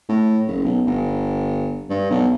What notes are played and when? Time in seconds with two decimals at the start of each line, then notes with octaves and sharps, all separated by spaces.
0.09 A2
0.47 F#1
0.65 B1
0.87 G1
1.90 G2
2.10 B1